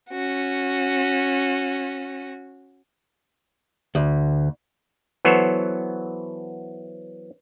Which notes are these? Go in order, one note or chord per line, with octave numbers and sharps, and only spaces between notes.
C#4 F#4
D2
E3 F#3 B3 A4 C5 C#5